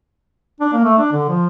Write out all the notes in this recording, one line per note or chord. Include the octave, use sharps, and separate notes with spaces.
D4
A#3
A3
D4
D3
F3